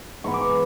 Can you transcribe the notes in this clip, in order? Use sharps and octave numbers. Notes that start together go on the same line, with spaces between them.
G#2 E3 G#3 B3 C#6
D6
C#6